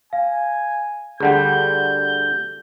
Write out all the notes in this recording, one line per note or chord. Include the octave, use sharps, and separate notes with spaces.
F5 G#5
D2 D3 G3 G#4 F#5 G6